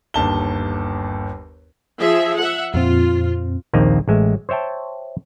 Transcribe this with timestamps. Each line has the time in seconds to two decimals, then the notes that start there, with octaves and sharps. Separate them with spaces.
0.14 G1 D#2 A5 G7
2.00 F3 G#4 E5
2.37 E5 F#5
2.74 F2 A#2 C4 F4
3.73 A#1 D#2 A#3 C4 D#5
4.08 A1 G#3 E5
4.49 C5 C#5 E5 G5 A5